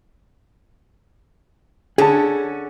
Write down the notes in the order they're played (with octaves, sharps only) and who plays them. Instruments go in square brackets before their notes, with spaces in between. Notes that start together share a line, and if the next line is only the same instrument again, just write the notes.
[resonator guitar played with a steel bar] D3 C#4 [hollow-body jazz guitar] G#4 A5